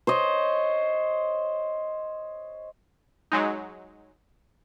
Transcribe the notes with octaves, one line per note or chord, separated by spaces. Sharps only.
C5 C#5 D#5
F#3 G#3 D#4